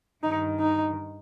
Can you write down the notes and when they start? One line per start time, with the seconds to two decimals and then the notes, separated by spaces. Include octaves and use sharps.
0.23 G2 D#3 D#4
0.59 D#4